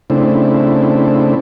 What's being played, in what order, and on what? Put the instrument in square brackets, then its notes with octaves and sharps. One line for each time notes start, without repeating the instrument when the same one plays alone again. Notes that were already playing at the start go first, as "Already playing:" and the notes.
[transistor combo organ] C#3 A3 C4 D4 E4